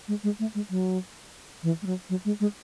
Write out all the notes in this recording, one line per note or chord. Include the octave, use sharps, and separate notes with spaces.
G#3
G#3
A3
G#3
F#3
E3
G#3
F#3
F#3
G#3
G#3